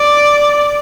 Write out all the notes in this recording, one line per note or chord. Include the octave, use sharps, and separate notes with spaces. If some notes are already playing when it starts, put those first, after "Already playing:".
Already playing: D5